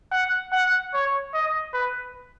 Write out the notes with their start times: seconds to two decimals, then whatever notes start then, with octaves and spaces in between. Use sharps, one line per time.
0.12 F#5
0.52 F#5
0.94 C#5
1.34 D#5
1.73 B4